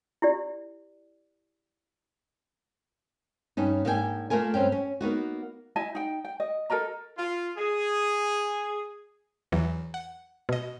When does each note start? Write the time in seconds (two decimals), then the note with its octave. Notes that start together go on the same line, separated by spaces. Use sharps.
0.22 E4 G4 D5
3.57 G2 C#4 D#4
3.85 G#2 A#3 D4 A4 G5 G#5
4.30 A3 A#3 F4 A#4 G#5
4.54 G2 C4 C#4 G5
4.72 C#4
5.01 A#3 B3 D#4 F#4
5.76 E4 D#5 G#5 A5
5.95 D#4 G5
6.25 G5
6.40 D#5
6.70 A4 A#4 D#5 A#5
7.18 F4
7.57 G#4
9.52 E2 E3 F#3
9.94 F#5
10.49 B2 D#5